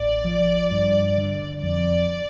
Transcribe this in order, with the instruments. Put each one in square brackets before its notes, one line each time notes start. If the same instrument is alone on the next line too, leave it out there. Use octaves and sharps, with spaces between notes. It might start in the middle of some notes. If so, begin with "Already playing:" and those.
Already playing: [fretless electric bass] A1 [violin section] D5
[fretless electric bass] F3
G2
D3
[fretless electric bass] F2 [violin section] D5